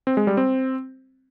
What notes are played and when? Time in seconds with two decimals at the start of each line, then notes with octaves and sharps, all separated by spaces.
0.07 C4
0.17 G#3
0.27 G3
0.37 C4